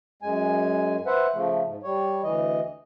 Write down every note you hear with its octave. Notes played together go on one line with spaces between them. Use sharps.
F#2 G#3 G#5
B4 C5 E5 F#5
C#3 F3 A3
G#2
G3 C#5
D2 E3 D#5